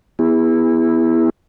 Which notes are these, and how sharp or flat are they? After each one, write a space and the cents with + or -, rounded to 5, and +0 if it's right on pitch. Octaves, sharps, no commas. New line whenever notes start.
B3 -10 E4 +0 G#4 -30